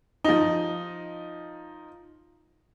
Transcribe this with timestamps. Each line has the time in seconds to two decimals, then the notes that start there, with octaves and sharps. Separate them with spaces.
0.24 F3 D#4